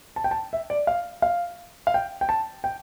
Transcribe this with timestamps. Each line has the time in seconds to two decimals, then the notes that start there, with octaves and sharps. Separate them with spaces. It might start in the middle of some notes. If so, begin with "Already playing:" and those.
0.16 A5
0.24 G5
0.31 A5
0.53 E5
0.70 D5
0.87 F5
1.22 F5
1.87 F5
1.94 G5
2.21 G5
2.29 A5
2.64 G5